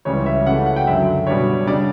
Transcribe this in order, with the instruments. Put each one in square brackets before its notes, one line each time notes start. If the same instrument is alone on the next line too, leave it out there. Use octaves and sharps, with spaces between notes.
[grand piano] C#2 C#3 E3 G3 C#5
E5
C#3 E3 A3 F#5
F#5
G5
F#2 D3 F#3 E5
B2 G3 D4 C#5
C#3 G3 D4 D5